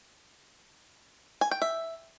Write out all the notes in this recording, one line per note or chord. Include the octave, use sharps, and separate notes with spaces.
G#5
G5
E5